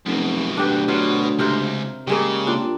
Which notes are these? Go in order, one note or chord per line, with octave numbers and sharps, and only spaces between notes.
F1 F#2 B2
D2 D4 G4 B4
B2 F#3 F4
C#2 C3 A#4 C5
C#3 G3 G#3 A#3
A#2 C4 D4